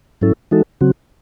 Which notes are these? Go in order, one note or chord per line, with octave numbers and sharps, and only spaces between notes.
G#2 F#3 C#4 E4 A4
E3 G#3 D#4 F#4 A4
C#3 F#3 C4 F#4